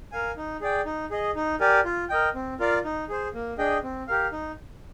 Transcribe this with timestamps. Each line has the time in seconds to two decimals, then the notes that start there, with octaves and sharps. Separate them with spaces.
0.12 A#4 F5 G#5
0.37 D#4
0.61 G#4 D5 G5
0.86 D#4
1.11 G#4 D#5
1.36 D#4
1.60 G4 A#4 D5 G#5
1.85 F4
2.09 A#4 D#5 G5
2.35 C4
2.60 F4 A#4 D5 F5
2.85 D#4
3.09 G#4 C5
3.34 A#3
3.58 D4 G#4 D#5 G5
3.83 C4
4.08 G4 A#4 F5
4.32 D#4